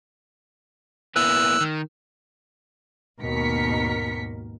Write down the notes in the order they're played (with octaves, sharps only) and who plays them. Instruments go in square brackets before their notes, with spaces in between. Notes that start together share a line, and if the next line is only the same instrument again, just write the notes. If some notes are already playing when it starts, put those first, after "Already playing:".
[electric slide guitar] A#3 B3 E4 [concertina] E6 F#6
[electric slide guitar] D#3
[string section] G#1 D#2 B2 A#4 B6 C#7